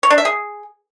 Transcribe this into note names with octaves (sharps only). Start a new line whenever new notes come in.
C#5
D4
E5
G#4